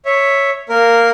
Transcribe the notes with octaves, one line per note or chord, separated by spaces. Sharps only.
C#5 E5
A#3 A#4